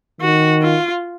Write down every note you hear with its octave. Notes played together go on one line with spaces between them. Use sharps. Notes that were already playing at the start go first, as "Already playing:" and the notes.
D#3 F#4
F4